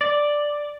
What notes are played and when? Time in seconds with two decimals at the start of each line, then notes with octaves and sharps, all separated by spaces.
0.01 D5